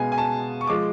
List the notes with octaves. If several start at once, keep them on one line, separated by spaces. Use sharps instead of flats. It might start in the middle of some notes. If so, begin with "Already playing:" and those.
Already playing: B2 G#3 B3 F5 G#5
G#5
A5
C#6
F3 G#3 D6